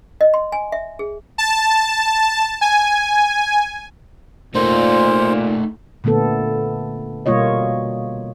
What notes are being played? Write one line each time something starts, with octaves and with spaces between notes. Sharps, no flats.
D#5
C6
G#5
E5
G#4
A5
G#5
A#2 A3 D#4 C5
A#2 D3 A3 B3 A4
B2 G3 A#3 F4 C#5 D#5